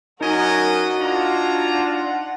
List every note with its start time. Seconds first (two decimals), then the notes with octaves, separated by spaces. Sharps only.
0.21 F#2 B3 D4 D#4 F#4 A#4 D#5 G#5
0.99 C4 D4 F4 C#5 A#5
1.68 F#5